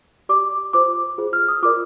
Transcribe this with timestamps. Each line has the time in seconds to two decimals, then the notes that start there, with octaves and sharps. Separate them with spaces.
0.29 G4 D5 D6
0.73 F4 C5 D6
1.18 F4 G#4 C5
1.33 F6
1.48 D#6
1.62 F4 A#4 D5 D6